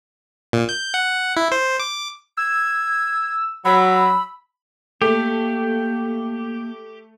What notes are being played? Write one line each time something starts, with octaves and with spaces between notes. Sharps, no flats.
A#2
G6
F#5
E4
C5
D6
E6 G#6
F#3 B5 E6
A3 A#3 G4